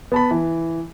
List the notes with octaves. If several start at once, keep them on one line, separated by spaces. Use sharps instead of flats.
B3 A5 B5
E3